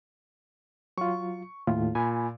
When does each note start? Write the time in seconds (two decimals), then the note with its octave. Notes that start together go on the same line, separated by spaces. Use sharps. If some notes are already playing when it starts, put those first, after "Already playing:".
0.98 F#3 F4 C#6
1.67 D#2 A2 F4
1.95 A#2 G#5 B5